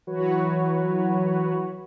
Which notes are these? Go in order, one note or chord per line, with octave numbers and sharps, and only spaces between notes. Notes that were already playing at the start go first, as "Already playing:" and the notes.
E3 F#3 F#4 B4 C#5